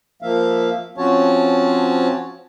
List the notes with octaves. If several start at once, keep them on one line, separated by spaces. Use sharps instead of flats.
F3 A#3 E5 F5
F3 C4 C#4 F#4 C#5 A5